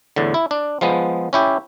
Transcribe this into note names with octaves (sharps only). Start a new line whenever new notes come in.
E2 A2 D3
E4
D4
F3 G#3 B3
C#4 E4 G4